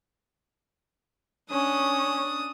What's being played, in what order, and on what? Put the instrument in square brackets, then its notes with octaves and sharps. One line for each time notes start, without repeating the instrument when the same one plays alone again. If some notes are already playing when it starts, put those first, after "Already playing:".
[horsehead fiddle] C#4 [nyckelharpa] D4 D#6